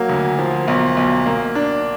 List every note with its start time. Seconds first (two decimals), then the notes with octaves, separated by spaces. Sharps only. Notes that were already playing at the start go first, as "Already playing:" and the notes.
Already playing: F#3 A#3
0.10 D2
0.39 F3
0.68 B1
0.97 B1
1.26 A#3
1.55 D4